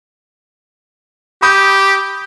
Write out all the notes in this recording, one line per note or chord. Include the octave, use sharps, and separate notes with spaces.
G4 B5 D#6 G6